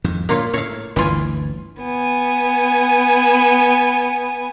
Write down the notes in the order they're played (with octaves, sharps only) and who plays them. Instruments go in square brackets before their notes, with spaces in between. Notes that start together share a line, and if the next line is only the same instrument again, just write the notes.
[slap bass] F2 G#2 D#3
[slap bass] A#2 [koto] A#3 F4 C#5
[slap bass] A2 [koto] C#5 F5
[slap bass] G1 D2 [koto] E3 F4 G#5
[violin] B3 G#5